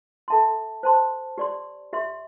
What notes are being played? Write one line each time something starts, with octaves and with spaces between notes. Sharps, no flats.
A4 E5 A5 C6
C5 A5 C6
G4 D5 C6
G4 E5 C6